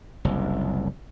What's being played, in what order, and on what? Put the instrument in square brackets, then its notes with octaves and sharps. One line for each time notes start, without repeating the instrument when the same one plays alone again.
[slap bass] F#1 C2